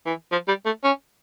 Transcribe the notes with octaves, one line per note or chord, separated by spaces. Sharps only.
E3
F3
G3
A3
C#4